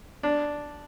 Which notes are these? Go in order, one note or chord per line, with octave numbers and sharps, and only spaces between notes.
D4